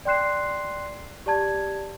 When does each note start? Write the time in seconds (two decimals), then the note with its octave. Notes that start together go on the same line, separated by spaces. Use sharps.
0.05 D5 G5 C6 F#6 C7 E7
1.26 G4 D5 A5 G#6